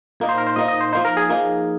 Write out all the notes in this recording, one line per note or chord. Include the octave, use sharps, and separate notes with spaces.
A#2 A#3 D#4
C5
A#4
C5
A#2 A#3 D#4 D#5
D#5
C5
F3 A#3 D#4 C5
A#4
G#4
F3 A#3 D#4